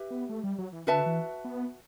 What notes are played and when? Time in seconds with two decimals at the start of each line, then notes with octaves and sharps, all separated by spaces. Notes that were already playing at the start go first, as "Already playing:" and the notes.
Already playing: G4 B4 E5
0.11 B3
0.29 A3
0.44 G3
0.58 F#3
0.73 E3
0.87 D3 F#4 B4 E5 A5
1.06 E3
1.45 B3